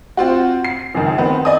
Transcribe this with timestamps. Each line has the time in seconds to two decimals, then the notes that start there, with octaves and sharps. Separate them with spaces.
0.17 C4 F4 F#4
0.64 C7
0.94 C#2 F#2 D#3
1.18 D#3 B3 C4
1.45 D5 D#5 G#5 D#6